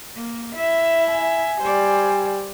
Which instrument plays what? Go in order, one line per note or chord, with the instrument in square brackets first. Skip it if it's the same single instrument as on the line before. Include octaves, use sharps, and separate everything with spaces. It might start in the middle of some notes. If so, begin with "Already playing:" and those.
[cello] A#3
[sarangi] E4 [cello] E5
[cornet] G#5
[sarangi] G3 [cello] C5 D5